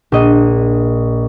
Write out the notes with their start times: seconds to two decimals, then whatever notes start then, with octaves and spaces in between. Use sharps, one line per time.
0.12 A#1 D#5